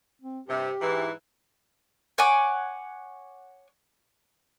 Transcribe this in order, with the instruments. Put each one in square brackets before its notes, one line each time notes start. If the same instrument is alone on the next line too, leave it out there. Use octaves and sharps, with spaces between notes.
[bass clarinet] C4
[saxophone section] G2 C3 [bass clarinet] G4
[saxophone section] G#2 E3
[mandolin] C#5 F#5 G#5 D6